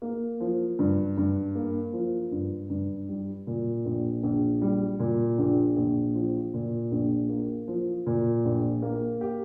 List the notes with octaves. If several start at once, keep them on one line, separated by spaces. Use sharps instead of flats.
A#3
F3
G2
G2
A#3
F3
G2
G2
G3
A#2
A#1
A#1
G3
A#2
A#1
A#1
F3
A#2
A#1
A#3
F3
A#2
A#1
A#3
G4